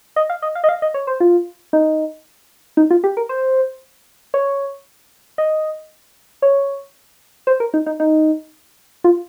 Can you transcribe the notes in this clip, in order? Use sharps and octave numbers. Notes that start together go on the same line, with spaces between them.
D#5
F5
D#5
F5
D#5
F5
D#5
C#5
C5
F4
D#4
D#4
F4
G4
A#4
C5
C#5
D#5
C#5
C5
A#4
D#4
D#4
D#4
F4